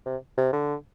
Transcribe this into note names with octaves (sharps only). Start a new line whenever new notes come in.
C3
C3
D3